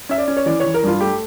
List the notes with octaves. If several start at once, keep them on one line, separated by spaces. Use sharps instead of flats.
C#4 E5
D5
C#4
C#5
E3 D5
E3 C#5
A#4
G2 F4
A3 G4